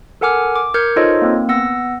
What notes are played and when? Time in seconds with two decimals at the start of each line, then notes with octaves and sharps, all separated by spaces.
0.21 A4 A#4 F#5 G#5 D6 F6
0.56 D6
0.74 A#4 F6 G6 G#6 C#7
0.96 D#4 F4 A4 C5 C#5 D#5
1.22 A#3 C4
1.48 B3 F#5 E6 A#6